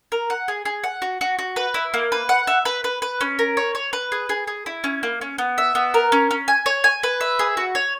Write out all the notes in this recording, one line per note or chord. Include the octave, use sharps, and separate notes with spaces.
A#4
F#5
G#4
G#4
F#5
F#4
F#4
F#4
B4
E4
A#3
B4
F#5
E5
B4
B4
B4
C#4
A#4
C#5
C#5
B4
G#4
G#4
G#4
E4
C#4
A#3
C#4
B3
E5
B3
A#4
C#4
C#4
G#5
C#5
G#5
B4
E5
G#4
F#4
C#5